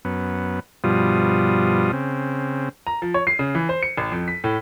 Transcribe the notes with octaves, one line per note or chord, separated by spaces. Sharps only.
F#2 B3
G2 B2 F3 G3 F4 D#6
C#3 C4
A#5
F3
C#5
C7
C#3
E3
C5
C#7
A1
F2
B6
A2